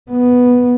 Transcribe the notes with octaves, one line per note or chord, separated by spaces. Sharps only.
B3